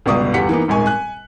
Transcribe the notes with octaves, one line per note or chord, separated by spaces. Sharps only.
G1 C#2 B2 D5 C#6 D#6
G1 E2 G4 F#5 B6 C#7
E3 A#3 B3 D#4
D#1 G#1 G#2 G#5 C#6
G#5 F#6